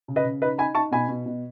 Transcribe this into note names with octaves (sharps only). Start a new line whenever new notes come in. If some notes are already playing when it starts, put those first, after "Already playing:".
C#3
B4 D#5
C#3
D#4 B4 D#5
D#4 G#5 B5
D#4 A5 C#6
B2 G#5 B5
B2
B2